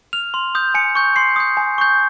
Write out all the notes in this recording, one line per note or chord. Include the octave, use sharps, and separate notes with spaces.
F6 F7
C6
D#6 G6
G#5 C#7
C#6 G6
C6 C7
D#6 G6
G#5
C#6 G6